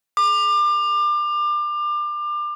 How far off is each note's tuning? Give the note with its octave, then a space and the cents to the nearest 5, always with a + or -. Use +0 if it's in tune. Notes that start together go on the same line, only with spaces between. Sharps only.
D6 +30